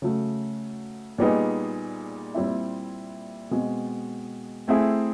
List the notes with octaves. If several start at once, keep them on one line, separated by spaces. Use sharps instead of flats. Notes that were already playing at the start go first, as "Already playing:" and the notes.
C#3 F#3 A3
A#2 G3 B3 D#4 G#4
A#2 G3 C4 E4
B2 G#3 C4
A3 C4 E4 G#4